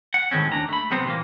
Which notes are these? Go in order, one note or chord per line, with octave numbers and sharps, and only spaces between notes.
F#5
A2 D#3 G#3 C4 C#4
D#2 D4 A#5
A3 B5
B1 C3 B3 C4 C5
A#2 E3 A3 A#3